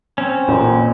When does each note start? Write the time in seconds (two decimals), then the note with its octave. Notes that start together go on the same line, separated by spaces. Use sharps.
0.18 C4 C#4
0.48 A1 A#2